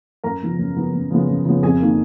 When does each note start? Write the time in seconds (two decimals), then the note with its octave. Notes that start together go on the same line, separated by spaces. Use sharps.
0.24 F#2 A#4 A#5
0.42 C#3 F3 G#3 B3
0.59 F#2
0.76 C#3 F3 G#3 B3
0.93 F#2
1.10 C#3 F3 G#3 B3
1.28 F#2
1.45 C#3 F3 G#3 B3
1.63 F2 G#4 G#5
1.80 D#3 A#3